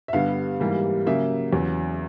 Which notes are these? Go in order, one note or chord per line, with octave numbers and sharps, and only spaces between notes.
E5
G2 D3 G3 B3 F5
G#2 E3 G3 A#3
C#3 F#3 A#3 E5
E2 C#3 F#3 B3